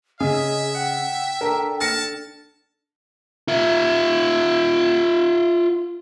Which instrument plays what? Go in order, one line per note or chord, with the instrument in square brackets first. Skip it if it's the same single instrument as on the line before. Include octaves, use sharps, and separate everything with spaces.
[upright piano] C#3 [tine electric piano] G#4 [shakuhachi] D#5 [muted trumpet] E5
[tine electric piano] F#5 [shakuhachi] G5
[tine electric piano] D4 A4 [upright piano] A#4
[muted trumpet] A5 [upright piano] F6 A#6 C#7
[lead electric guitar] F4 E5